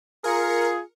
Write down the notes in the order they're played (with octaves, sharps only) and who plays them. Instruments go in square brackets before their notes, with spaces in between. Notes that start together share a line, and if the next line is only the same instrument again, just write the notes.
[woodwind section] F4 G#4 [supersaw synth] A#4 C#7